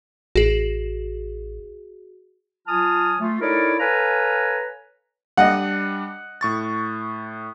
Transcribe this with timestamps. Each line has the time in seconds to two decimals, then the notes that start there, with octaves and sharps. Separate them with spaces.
0.36 A1 F#4 G#4
2.67 F#3 F4 G#5 A5 D#6 F6
3.20 A3 F4
3.41 D#4 E4 A4 A#4 C#5 D5
3.79 A4 B4 C#5 F5 G#5 A#5
5.37 G3 D4 D#5 F#5 F#6
6.41 A2 C#6 A6